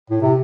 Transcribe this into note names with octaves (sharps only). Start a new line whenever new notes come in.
A2
C3